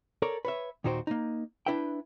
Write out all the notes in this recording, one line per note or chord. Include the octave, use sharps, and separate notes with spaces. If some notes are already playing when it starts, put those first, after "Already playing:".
A4 A#4 C#5 D5
B4 C#5 E5
D#2 A#2 D#4 F#4 C5 G5
A#3 D#4
D4 E4 B4 E5 G5